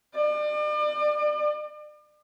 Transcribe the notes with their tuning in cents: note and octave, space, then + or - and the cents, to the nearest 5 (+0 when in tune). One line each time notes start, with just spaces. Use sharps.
D5 +40